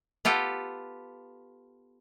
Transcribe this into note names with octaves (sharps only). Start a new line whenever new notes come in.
B3 F4 G4 A4